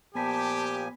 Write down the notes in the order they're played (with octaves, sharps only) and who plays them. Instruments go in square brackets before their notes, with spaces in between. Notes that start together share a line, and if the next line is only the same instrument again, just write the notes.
[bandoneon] A#2 F3 G#5 [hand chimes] B3 B5 B6 [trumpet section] G4 [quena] A5